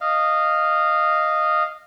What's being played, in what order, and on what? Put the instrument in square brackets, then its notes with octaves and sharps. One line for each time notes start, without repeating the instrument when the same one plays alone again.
[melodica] D#5 F5